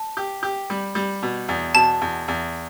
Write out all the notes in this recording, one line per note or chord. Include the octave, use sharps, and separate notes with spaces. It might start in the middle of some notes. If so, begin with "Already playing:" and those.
Already playing: A5
G4
G4
G3
G3
B2
E2
B2 A5
E2
E2